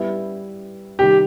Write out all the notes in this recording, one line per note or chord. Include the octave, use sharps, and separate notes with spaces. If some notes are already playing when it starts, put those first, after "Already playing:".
Already playing: G3 B3 E4
C3 D#3 G3 G4